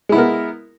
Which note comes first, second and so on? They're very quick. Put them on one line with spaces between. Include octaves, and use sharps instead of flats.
G#3 E4 B3 A#4